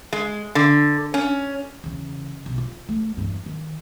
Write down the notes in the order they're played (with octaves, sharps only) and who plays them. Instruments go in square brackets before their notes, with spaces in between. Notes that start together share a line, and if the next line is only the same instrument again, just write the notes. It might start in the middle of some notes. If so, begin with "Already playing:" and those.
[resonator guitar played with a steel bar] G#3
D3
C#4
[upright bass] E2 C#3
B1
F4
A3
E2 G2
D#3